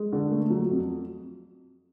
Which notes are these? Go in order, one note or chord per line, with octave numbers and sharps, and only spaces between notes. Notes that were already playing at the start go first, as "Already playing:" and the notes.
Already playing: G#3
D3
A3
F#3
F2